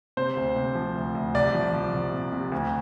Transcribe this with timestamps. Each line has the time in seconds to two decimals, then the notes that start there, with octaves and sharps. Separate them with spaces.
0.17 C3 C5
0.37 D2
0.56 C3
0.75 F3
0.95 D2
1.15 D2
1.35 C2 D5
1.55 F3
1.73 F3
1.94 C2
2.14 C3
2.32 C3
2.52 D2